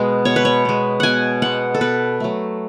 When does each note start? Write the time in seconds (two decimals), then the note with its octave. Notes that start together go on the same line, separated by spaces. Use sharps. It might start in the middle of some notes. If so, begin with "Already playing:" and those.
Already playing: B2 G#3 B3
0.25 B2 C#5
0.36 B4
0.45 C#5
0.65 G#3 B3
1.00 B2 F#5 G#5
1.42 G#3 B3 F#5
1.74 A4
1.81 B2 B4
2.20 F#3 A3